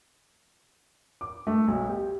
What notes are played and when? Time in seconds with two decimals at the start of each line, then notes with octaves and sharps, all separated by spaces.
1.21 D6
1.47 A3
1.68 B1
1.89 G4